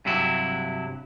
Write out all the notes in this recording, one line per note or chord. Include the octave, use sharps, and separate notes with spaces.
G2 C3 F#3 E4